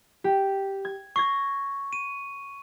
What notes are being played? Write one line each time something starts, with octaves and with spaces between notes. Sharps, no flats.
G4
G#6
C#6 G#6 A#6 C7
D#7